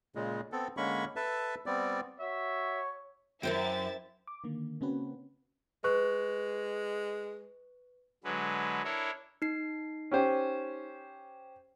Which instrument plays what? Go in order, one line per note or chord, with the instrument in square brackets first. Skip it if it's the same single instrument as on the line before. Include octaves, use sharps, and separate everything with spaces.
[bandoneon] A#2 C#3 G#3
B3 C4 A4
D3 G#3 A#3 C#4 B5 C#6
A4 B4 E5 A5
G3 B3 C4 D5
[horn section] F#4 E5 [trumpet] C#5
[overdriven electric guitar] F#2 [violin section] E4 E5 A6 [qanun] A#4 C5 G5
[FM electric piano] D6
D3 D#3 A#3
C#3 A#3 C4 C#4 F#4 B4
[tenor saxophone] G#3 [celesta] B4 C#6 F#6
[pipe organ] D3 F#3 G#3 B4
D4 E4 A4 A#4 C#5
[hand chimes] D#4 C7
[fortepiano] C#4 G4 C5